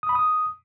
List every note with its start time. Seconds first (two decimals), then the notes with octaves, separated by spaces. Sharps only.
0.03 D#6
0.09 B5
0.15 D#6